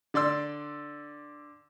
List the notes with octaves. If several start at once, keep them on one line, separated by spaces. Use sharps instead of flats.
D3 D5 C6 E6